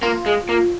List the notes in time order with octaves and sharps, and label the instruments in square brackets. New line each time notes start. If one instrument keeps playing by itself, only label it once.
[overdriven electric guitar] A#3 [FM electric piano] F4
[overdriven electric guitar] G#3
A#3